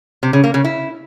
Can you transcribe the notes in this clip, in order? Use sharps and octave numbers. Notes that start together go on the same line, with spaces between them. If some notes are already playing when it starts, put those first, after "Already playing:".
C3
C#3
A#3
C#3
E4